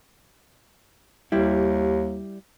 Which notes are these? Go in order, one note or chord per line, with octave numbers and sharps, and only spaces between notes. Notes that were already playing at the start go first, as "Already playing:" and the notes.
D#2 G3 E4